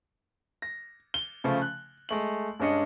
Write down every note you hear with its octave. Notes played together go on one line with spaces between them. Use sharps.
A#6
G7
C#3 F3 A3
F#6
G#3 A3 F#7
G2 G#3 C#4 D4 D#5 C#7